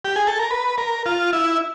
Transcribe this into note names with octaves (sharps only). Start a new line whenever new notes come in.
G4
G#4
A4
A#4
B4
A#4
F4
E4